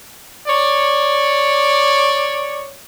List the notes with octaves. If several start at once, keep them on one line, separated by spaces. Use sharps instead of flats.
C#5 D5